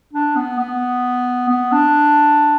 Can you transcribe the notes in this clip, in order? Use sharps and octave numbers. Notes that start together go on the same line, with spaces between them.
D4
B3
B3
B3
D4